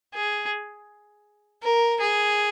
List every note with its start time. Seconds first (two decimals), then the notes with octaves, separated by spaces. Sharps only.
0.14 G#4
1.63 A#4
2.00 G#4